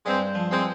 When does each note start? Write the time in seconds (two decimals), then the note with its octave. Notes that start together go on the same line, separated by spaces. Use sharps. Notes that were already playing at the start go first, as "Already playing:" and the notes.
0.05 G2 G#3 C4
0.35 F3
0.50 G#3 C4